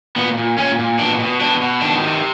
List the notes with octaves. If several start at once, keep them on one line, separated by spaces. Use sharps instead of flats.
A#2 B3
A#2
A#2 C#4
A#2
B2 D4
B2
B2 D4
B2
D#3 D4
C3